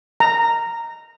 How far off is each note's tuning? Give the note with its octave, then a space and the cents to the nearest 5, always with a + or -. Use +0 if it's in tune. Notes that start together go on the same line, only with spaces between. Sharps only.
A#5 -10